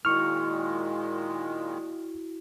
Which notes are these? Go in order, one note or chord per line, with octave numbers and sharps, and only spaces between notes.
A#2 D#3 G#3 E4 F#4 C#6 F6